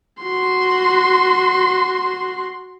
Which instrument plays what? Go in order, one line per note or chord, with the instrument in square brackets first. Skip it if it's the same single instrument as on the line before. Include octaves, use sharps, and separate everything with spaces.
[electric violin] F#4 C6